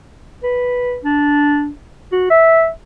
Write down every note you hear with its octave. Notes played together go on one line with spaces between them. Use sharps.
B4
D4
F#4
E5